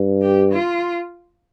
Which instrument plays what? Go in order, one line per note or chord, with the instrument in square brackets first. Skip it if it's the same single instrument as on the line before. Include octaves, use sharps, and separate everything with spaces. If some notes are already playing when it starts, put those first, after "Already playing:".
Already playing: [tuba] G2
[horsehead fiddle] G4
F4